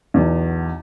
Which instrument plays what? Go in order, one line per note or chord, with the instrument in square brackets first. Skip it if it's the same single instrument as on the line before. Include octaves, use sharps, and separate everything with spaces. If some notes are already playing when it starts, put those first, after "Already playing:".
[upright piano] B1 E2